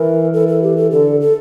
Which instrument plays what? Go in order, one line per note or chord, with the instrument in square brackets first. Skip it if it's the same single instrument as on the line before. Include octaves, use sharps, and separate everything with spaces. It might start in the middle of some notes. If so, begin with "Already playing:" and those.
Already playing: [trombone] E3 [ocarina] A#4
[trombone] E3 [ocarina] A4
[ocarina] A4
G4
A4
[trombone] D3 [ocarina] A4
[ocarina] A4